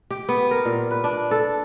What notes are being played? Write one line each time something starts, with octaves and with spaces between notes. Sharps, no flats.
G4
B3
A#4
A#2
B4
D4
A4